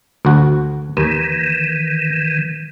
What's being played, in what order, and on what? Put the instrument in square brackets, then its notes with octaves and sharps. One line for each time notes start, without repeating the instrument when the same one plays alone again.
[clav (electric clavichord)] D2 F#4
[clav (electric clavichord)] D#2 [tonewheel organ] D#3 E3